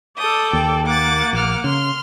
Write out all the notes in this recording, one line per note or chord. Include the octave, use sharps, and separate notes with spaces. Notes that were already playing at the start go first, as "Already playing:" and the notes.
A4 D5 D#6 G6
D#2 G5
A#3 F#5 D6 A6
A#1 D6 F6
C#3 C6 F6